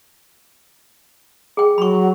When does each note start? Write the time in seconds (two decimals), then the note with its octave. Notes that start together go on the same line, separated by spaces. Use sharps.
1.57 G#4 G5
1.78 F#3 B5 C#6